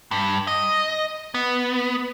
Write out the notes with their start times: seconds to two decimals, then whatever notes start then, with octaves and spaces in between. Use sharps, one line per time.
0.11 G2
0.47 D#5
1.34 B3